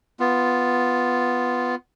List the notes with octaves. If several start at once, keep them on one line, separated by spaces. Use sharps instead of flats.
B3 F4